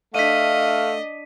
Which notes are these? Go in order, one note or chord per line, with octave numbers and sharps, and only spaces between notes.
A3 D4 D#5 F5 B6 D#7